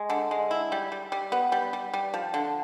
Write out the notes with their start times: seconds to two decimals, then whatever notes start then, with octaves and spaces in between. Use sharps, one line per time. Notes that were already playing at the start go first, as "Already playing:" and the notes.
Already playing: G#3
0.10 D3
0.31 G#3
0.51 E4
0.72 G3
0.92 G3
1.12 G3
1.32 B3
1.52 G3
1.73 G3
1.94 G3
2.14 F3
2.34 D3